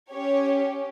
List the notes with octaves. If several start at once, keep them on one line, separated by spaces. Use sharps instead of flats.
C#4 G4 C#5